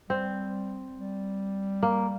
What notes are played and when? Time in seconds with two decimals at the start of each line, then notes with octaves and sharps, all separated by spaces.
0.09 G3 C4
0.96 G3
1.83 A#3